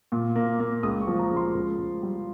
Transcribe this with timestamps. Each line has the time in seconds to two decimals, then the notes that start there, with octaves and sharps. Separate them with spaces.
0.12 A#2
0.35 A#3
0.60 A#3
0.83 C#2 D#6
1.01 C#6
1.07 F3
1.19 A#5
1.31 C#2
1.37 C6
1.55 C#2
1.78 C#2
2.03 G3